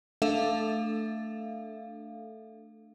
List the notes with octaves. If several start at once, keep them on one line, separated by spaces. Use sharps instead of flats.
A3 D4 A4 E5 F5